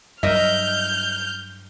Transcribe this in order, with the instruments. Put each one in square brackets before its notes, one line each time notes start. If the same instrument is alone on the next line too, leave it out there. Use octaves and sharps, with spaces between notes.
[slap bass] G2 F#3 [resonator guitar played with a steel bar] A#4 D#5 E5 [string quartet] F6 G6